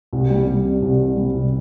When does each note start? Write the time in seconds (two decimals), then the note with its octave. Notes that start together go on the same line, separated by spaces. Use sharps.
0.13 C2
0.30 G3
0.47 G3
0.65 C3
0.82 C2
0.99 C3
1.17 G3
1.34 C2